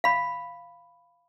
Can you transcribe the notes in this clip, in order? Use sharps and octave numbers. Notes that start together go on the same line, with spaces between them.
F5 B5